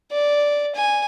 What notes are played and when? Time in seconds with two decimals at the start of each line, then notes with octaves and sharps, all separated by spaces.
0.11 D5
0.75 G#5